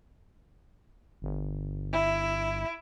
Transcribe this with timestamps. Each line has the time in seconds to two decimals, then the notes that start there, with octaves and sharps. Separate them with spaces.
1.22 G1
1.93 E4